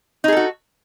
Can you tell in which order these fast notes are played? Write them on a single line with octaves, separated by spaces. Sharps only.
D#4 G#4 A4 F#4